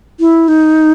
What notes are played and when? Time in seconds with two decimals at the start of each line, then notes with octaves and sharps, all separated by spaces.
0.20 E4
0.48 D#4